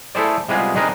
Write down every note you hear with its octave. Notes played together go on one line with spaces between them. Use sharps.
A3 E4 G#4 A4 C5 D5
C3 G3 G#3 B3 F4 G#4
C4 D4 D#4 G#4 A#4 B4